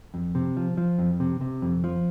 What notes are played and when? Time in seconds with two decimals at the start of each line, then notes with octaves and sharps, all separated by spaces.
0.14 F2
0.35 C3
0.57 F3
0.77 F3
0.99 F2
1.20 C3
1.41 C3
1.62 F2
1.84 F3